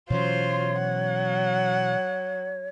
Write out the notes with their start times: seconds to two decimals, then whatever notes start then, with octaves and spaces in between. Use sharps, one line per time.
0.10 B2 E3 F#3 C#4 F4 C5 C#5
0.79 F#3 F#5